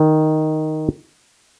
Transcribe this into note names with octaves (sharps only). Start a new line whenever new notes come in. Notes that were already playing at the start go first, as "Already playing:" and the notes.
Already playing: D#3